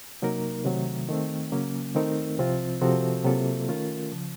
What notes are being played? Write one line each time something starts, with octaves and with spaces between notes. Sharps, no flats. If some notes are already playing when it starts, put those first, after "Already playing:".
C3 F#3 A#3 D#4 A#4
C3 D#3 F#3 A3
D#3 A3 C4
C#3 F#3 A#3 C#4
D#3 A3 C4 D#4 A#4
C2 C3 F3 C4 F4
C3 F3 C4 F#4 A4
C3 F#3 A#3 F4 A4
D#3 A3 C#4 F4 A#4
C#3 F3